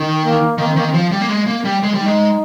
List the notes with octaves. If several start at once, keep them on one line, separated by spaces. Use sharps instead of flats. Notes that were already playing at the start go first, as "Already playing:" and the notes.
Already playing: D#3
A#3
D#3 A#3
C4
D#3 A#3
C4
F3
G3
A#3
G#3
A#3
G3
G#3
G3
D#4
G#3